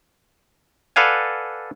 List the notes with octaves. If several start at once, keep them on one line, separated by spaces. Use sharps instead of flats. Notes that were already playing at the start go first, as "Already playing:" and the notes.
A4 B4 D5 F5 F#5 G#5